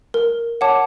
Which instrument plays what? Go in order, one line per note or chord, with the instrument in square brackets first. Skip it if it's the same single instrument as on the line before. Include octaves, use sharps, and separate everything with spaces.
[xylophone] A#4
C#5 F#5 A5 D6